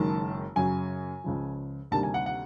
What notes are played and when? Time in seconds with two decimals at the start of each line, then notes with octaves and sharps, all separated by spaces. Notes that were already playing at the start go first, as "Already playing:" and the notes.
Already playing: F#1 F#2 D#3 G#3 A5
0.56 F#2 C#3 F#3 G#5
1.24 C#2 C#3 F3
1.91 D2 C3 D#3 G3 A#3 A5
2.03 G#5
2.14 F#5
2.26 F#5